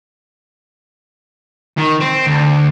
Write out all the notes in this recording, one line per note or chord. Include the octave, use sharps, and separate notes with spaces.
D#3
C4
D2